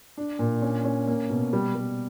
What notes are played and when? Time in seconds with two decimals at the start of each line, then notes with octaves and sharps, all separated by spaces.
0.17 D4
0.39 A#2
0.62 C#4
0.84 C#4
1.07 A#3
1.30 B2
1.53 G3
1.75 G3